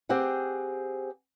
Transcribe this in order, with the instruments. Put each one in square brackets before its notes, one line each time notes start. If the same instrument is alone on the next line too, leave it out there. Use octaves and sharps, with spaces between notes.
[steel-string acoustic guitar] C4 G4 G#4 F#5